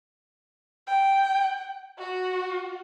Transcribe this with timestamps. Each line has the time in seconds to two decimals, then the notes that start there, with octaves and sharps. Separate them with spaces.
0.87 G5
1.98 F#4